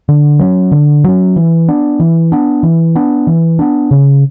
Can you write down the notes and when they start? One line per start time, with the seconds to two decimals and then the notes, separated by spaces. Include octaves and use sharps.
0.09 D3
0.39 F#3 C#4
0.72 D3
1.04 F#3 C#4
1.36 E3
1.68 B3 D4
2.00 E3
2.32 B3 D4
2.63 E3
2.96 B3 D4
3.27 E3
3.59 B3 D4
3.91 C#3